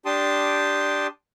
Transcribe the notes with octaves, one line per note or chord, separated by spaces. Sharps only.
D4 G4 G5 A5 C6 D#6